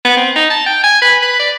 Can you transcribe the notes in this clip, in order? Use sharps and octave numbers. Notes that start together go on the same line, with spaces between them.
B3
C4
D#4
A5
G5
G#5
B4
B4
D5